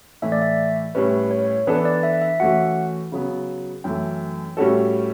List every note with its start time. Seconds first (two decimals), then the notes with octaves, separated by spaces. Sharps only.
0.22 A2 E3 A3 E5
0.32 D5
0.42 E5
0.95 A2 G3 C#4 B4
1.31 C#5
1.67 E3 B3 D4 A4 B4
1.85 D5
2.03 E5
2.22 E5
2.40 E3 A3 C#4 F#4 F#5
3.12 C#3 F#3 B3
3.84 F#2 E3 A3 G5
4.57 A2 G3 C#4 F#4 A4